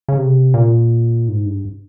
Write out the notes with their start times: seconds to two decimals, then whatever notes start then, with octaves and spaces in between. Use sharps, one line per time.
0.09 C#3
0.18 C3
0.54 A#2
1.28 G#2
1.46 G2